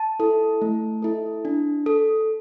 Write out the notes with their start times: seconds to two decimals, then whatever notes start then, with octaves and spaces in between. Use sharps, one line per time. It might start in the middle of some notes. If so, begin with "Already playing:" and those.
Already playing: A5
0.19 E4 A4
0.62 A3
1.02 E4 A4
1.45 D4
1.86 A4